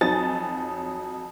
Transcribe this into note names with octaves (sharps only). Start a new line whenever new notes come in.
F2 F#3 D#4 G#5 A6